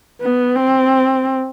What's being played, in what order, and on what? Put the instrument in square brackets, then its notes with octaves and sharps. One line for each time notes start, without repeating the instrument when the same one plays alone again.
[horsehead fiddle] B3
C4